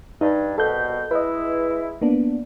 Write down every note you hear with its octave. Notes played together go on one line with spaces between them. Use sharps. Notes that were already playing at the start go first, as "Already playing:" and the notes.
G2 D#4
C2 B2 A4 G6
G#3 E4 B4 D#5
A#3 B3 D4